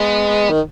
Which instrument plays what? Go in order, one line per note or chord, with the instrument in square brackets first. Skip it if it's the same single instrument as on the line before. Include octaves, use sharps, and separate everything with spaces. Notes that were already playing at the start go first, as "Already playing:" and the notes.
Already playing: [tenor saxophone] G#3 [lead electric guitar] B3
[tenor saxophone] D#3